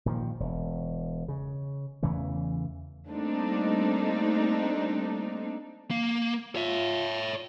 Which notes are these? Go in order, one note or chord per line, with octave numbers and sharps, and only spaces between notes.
A#2 D#3 F3
E1
C#3
E2 C#3 E3 A3
G3 A3 A#3 C4 D4 D#4
A#3
F4 C#5 E5